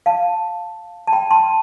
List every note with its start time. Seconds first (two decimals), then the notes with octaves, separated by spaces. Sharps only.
0.06 F5 A5
1.07 A5
1.13 G5 B5
1.31 A5 C6